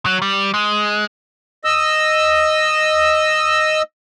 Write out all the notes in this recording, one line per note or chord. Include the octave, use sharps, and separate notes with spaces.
F#3
G3
G#3
D#5 E6